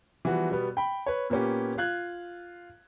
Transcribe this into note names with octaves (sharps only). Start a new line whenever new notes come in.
E3 F3 G3 B3 F#4
B2 G3 B3
G5 B5
B4 C#5
A#2 A#3 B3 C#4 G4
F4 F5 F#6 G#6